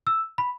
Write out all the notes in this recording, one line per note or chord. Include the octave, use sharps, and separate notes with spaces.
E6
B5